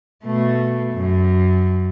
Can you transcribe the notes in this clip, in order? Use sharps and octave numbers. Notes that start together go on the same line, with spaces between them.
B2 A3
F#2